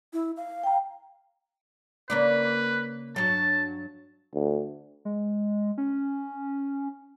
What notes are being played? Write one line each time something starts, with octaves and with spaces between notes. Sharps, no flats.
E4
F5
G5 A#5
C#3 A#3 B4 D5
G2 F#3 A5
D2
G#3
C#4